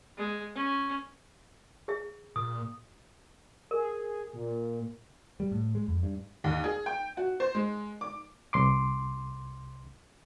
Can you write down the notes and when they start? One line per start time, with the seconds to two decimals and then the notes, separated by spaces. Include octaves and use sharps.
0.17 G#3
0.55 C#4
1.88 G#4 E5
2.36 A#2 D#6
3.71 G#4 A#4
4.33 A#2
5.40 G3
5.52 A2
5.75 G#3
5.88 F2
6.03 G2
6.44 D#2
6.64 G#4
6.86 G5
7.17 F#4
7.40 C5
7.55 G#3
8.01 D6
8.53 C2 C6 D6